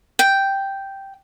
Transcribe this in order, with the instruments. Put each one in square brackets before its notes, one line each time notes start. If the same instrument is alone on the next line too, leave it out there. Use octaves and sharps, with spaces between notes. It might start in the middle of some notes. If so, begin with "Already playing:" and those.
[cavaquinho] G5